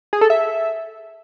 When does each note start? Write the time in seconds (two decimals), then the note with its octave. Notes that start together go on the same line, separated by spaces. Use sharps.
0.13 G#4
0.21 A4
0.30 E5